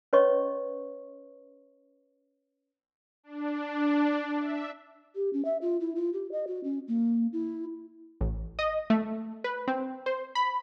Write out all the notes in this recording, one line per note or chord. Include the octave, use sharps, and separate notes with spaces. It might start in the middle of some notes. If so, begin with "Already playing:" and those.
C#4 B4 C#5 D#5 C6 C#6
D4
E5
G4
C#4
E5
F4
E4
F4
G4
D#5
F#4
C#4
A#3
E4
A1
D#5
A3
B4
C4
C5
B5